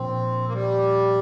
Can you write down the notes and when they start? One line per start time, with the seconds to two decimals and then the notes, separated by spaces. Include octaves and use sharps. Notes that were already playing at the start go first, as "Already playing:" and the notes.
Already playing: A#2 F3 C4 D4
0.47 A#3
0.53 G3